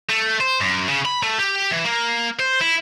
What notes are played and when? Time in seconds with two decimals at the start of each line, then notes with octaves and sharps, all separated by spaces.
0.09 A3
0.41 C5
0.61 F#2
0.88 C#3
1.06 B5
1.23 A3
1.38 G4
1.71 E3
1.85 A#3
2.40 C5
2.61 E4